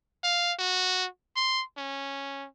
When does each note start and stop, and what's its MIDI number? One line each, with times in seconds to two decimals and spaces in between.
0.24 0.53 77
0.59 1.07 66
1.36 1.63 84
1.77 2.47 61